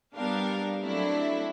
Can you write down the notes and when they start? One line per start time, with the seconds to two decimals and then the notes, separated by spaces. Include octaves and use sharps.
0.15 G3 B3 D4 G4 A#4 F5
0.81 F#3 A3 C4 D4 E4